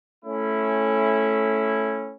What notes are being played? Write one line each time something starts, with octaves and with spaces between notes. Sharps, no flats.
A3 C#4 E4